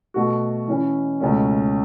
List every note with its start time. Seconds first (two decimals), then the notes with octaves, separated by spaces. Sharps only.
0.14 B2 A3 F#4
0.68 E3 C#4 E4
1.20 C#2 B2 A3 C#4